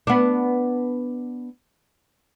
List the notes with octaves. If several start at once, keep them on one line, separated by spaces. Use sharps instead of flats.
B3 D4